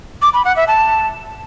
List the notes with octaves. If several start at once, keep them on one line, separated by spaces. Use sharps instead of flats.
D6
B5
F#5
E5
A5